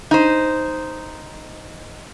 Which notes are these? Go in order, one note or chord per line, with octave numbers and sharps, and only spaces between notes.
D#4 C5